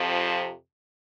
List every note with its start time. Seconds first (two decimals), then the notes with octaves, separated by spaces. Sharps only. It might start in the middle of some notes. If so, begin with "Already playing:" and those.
Already playing: F2 C3 F3